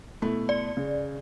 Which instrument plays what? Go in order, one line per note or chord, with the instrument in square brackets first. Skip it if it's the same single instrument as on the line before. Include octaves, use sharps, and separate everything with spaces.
[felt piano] B2 A3 E4
[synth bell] D5
[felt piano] C#3